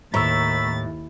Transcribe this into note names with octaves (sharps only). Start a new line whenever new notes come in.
D#2 A2 A#5 B5 C#6 E6 A6